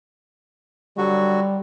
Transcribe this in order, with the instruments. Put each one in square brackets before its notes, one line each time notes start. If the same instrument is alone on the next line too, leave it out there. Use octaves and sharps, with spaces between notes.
[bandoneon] D3 F#3 F#4 [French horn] G3